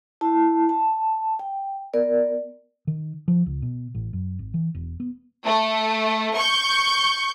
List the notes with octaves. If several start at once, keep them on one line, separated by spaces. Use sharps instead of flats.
E4 A5
A5
G5
B3 A#4 D5
D#3
F3
C#2
B2
A1
F#2
G#1
E3
E1
B3
A3
C#6 G6